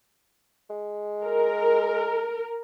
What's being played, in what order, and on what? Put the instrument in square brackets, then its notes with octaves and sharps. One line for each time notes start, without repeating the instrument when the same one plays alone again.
[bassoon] G#3
[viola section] A#4